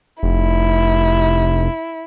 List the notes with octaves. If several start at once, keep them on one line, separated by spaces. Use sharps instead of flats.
F1 E4